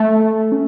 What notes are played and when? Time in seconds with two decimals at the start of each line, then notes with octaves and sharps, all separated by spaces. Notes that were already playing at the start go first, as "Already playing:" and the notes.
Already playing: A3
0.52 C#4